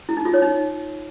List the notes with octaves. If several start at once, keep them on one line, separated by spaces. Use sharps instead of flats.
E4
D#4
F4
C#5
D#4